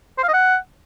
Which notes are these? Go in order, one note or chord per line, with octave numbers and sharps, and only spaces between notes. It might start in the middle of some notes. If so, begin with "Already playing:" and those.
C5
F5
D#5
F#5